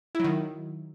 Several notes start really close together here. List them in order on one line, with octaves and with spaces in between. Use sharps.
E4 F#3 D#3